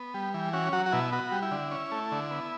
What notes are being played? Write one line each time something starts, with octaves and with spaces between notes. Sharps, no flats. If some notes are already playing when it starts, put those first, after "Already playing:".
Already playing: B3
G3
E3
C#4 F#4
F#3 F#4
F#4
B2 E4
B3 F#4
G3
E4
D3
C#4
A3
D3
B3